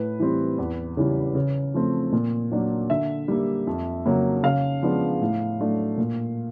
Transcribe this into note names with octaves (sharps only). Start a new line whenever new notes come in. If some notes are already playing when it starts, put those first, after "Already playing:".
Already playing: A2 B4
E3 G3 C4
E2
C#3 E3 G3
C#3
F3 A3 C4
A#2
F#3 A#3 D4
D3 E5
G3 A#3
F2
C#3 F#3 A#3
C#3 F5
F3 G#3 B3 D4
A2
F#3 A3 D4
A#2